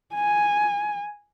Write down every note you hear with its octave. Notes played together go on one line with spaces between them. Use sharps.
G#5